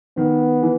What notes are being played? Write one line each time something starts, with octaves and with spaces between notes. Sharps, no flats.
D#3 B3
E3